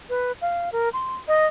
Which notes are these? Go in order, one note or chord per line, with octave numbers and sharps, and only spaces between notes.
B4
F5
A#4
C6
D#5